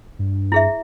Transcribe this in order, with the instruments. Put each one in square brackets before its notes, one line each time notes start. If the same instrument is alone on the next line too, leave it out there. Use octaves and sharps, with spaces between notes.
[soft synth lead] G2
[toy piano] E4 G#4 E5